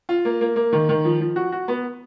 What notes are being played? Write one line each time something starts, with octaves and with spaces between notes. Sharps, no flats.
F4
A#3
A#3
A#3
D#3
D#3
F3
F3
F#4
F#4
B3